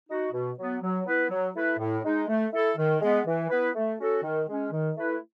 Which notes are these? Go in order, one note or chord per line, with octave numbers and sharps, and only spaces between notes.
D#4 F#4
B2
F#3 B3
F#3
B3 E4 B4
F#3
A3 E4 B4
A2
G#3 D#4
A3
E4 A4
D#3
G#3 B3
E3
B3 E4 B4
A3
C#4 F#4 A4
D#3
G#3 C#4
D#3
A3 E4 B4